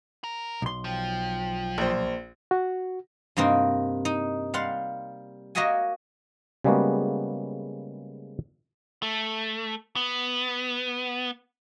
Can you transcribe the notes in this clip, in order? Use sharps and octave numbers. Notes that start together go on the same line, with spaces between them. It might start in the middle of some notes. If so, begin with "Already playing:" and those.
A#4
B1 C6
F3 G5
A#1 C5
F#4
G2 C3 A#3 C4 D#4
D#4
G3 F5 F#5 C6
A#3 F#4 D#5 E5 F#5 G#5
C#3 G3 G#3 A#3 B3 F#4
A3
B3